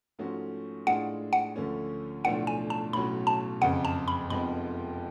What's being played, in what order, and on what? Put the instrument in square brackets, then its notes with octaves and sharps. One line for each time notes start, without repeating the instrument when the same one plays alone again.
[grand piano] G#2 F3 A3 C#4 F#4
[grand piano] A2 G#3 D4 F4 G#4 [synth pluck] F#5
[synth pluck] F#5
[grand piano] D2 D3 F3 A3 C#4
[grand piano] B1 A2 F3 A3 D4 [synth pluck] F#5
[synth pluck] G#5
A5
[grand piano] B1 A2 F#3 C#4 [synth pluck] B5
[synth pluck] A5
[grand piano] F#1 F2 C#3 [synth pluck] F#5
[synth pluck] A5
B5
[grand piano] F1 F2 F3 G#3 B3 [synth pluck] B5